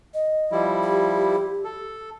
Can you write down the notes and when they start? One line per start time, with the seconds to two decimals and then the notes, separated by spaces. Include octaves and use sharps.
0.14 D#5
0.52 F3 G3 E4
0.83 G4
1.64 A4